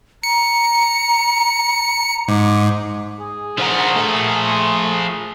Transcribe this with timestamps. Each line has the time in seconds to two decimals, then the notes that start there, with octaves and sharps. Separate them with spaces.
0.23 A#5 C#7
2.28 G#2 D6
3.19 G#4
3.58 D3 F3 A#4 C5 F#5
3.96 A3